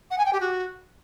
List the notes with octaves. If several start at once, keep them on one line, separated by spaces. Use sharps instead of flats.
F#5
G#5
G5
G4
F#4